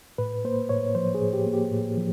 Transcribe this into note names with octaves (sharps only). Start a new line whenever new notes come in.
A2 B4
A#3 C5
A2 C#5
F3 C5
G#4
A2
G4
A#3
G4
A2
F3